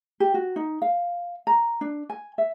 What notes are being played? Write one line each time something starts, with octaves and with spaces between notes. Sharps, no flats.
G4
F#4
D#4
F5
A#5
D4
G#5
E5